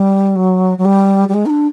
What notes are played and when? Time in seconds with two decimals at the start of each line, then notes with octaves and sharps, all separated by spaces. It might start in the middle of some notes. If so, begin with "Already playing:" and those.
Already playing: G3
0.35 F#3
0.78 F#3
0.85 G3
1.28 G3
1.34 G#3
1.46 D#4
1.50 D4